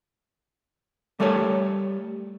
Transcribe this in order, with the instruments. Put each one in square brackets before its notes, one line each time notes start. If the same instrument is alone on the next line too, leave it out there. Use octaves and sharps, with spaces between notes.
[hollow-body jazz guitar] G3 A3 A4 A#4 C#5